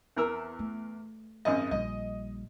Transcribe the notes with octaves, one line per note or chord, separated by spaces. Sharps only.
E2 A#4 E6
A3
G#1 F#2 D#5
A#1 G3 D#5